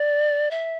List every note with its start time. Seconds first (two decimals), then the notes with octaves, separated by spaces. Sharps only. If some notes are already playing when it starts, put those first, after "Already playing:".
Already playing: D5
0.51 E5